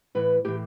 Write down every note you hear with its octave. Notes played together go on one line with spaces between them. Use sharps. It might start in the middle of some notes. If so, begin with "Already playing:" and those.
A2 E3 B4
A2 E3 G4